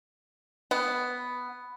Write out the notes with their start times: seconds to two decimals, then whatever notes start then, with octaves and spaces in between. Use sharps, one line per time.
0.71 B3